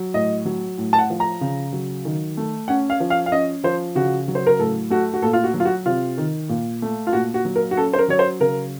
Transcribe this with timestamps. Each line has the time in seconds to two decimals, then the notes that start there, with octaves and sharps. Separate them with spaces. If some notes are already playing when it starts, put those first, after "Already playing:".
Already playing: F#3
0.14 A2 D#5
0.45 F#3
0.78 A2
0.93 A5
0.99 F#5
1.10 F3
1.20 A#5
1.41 C#3
1.73 F#3
2.05 D#3
2.37 A3
2.68 C#4 F#5
2.90 F5
3.00 F3
3.10 F5
3.26 F5
3.32 C#4 D#5
3.64 F3 C5
3.95 C#3 F#4
4.28 F#3
4.35 C5
4.47 A#4
4.59 A2 A4
4.90 A3 F#4
5.14 F#4
5.22 A#2 A4
5.33 F4
5.44 F#4
5.54 F#3
5.60 F4
5.65 F#4
5.86 C3 F4
6.18 D#3
6.49 A#2
6.82 A3
7.07 F4
7.13 A#2 F#4
7.34 F#4
7.45 F#3
7.56 A#4
7.71 F#4
7.77 C#4 A4
7.93 C5
7.99 A#4
8.08 F#3 C#5
8.19 C5
8.40 C#3 A#4